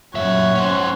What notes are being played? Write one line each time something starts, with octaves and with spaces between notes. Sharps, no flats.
F#2 A#2 C#5 E5 F#5
C#4 C5